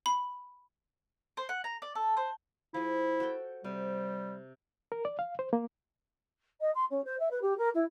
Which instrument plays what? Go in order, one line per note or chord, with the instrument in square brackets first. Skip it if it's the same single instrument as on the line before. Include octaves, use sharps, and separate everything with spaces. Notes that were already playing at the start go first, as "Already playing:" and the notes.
[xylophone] B5
[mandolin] C5
F#5
A#5
D5
A4
C5
[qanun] F3 G#4 [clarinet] E4
[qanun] F#4 A4 G5
[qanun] C3 [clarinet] G3
[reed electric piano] A#4
D5
F5
C5
A#3
[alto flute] D#5
C6
C#4
C5
E5
B4
G4
A#4
E4